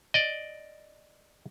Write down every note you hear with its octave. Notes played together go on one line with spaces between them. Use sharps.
D5 D#5